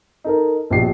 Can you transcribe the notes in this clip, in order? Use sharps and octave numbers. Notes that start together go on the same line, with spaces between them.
D#4 A4 A#4
A#1 B2 G4 C7